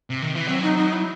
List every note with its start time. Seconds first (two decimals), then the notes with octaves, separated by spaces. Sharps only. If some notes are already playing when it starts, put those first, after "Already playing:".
0.10 C3
0.22 D#3
0.35 E3
0.47 F#3 C4
0.62 D#4
0.78 D#4
0.93 E4